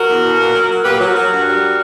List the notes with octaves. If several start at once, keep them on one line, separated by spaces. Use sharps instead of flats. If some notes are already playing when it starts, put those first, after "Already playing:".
Already playing: F#4 A#4
E2
B2
A#2
F#3
F#3
A#2 G4 B4
F#3
F#4 A#4
F#3
G2
G3